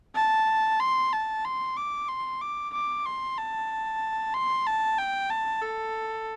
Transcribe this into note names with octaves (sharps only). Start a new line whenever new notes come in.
A5
C6
A5
C6
D6
C6
D6
D6
C6
A5
C6
A5
G5
A5
A4